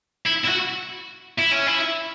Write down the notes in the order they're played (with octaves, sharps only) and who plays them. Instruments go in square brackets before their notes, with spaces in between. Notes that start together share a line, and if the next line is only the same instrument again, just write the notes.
[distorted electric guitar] E4
E4
F#4
E4
C#4
E4